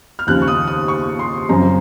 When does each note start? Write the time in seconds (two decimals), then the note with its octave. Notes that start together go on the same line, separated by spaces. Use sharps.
0.19 F6
0.27 D#2 C#3 F3 F#6
0.42 C#6
0.48 D#6
0.67 D#6
0.88 C#6
1.19 C6
1.49 F#2 C#3 F3 C4 A#5